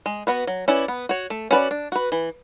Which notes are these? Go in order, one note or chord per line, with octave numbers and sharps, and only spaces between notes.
G#3
B3 F#4 B4
F#3
C#4 E4 B4 D5
B3
F#4 C#5
A3
C#4 F#4 B4 D5
D4
F#4 B4
E3